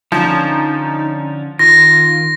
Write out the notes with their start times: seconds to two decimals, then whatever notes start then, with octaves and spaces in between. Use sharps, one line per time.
0.12 D3 F3 C#4 D#4
1.59 D#3 F4 A#6